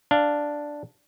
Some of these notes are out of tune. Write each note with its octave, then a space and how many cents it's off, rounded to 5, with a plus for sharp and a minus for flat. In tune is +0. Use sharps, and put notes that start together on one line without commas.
D4 +0 F5 -10